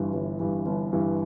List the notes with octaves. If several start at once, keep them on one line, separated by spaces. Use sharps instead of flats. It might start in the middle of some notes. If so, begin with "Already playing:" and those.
Already playing: G1 G2 E3
G1
G2 E3
G1
G2 E3